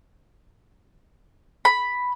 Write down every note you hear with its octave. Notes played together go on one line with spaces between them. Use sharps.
B5